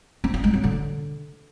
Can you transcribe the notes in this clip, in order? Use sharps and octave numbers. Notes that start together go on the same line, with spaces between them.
C4
F4
G#3
F#3
D3